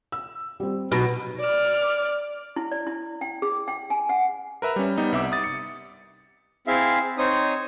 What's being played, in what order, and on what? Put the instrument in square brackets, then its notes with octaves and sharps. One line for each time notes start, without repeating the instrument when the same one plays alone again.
[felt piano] E6
G3 C4
[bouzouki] B2 [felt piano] F#3 D#4 F#4
[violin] D5 F6
[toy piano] E4
D5
E4
G5
G#4
G5
G#5
F#5
[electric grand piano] A#4 B4 E5 A#5
G3 C#4
G3 B3 D#4
C2 E5 D6
D#6 A6
C#7
[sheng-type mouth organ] C4 E4 G#4 E5 F5
C4 D#4 C5 C#5 D#6